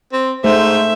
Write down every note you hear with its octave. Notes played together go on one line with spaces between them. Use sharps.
C4
G#2 A3 C5 E5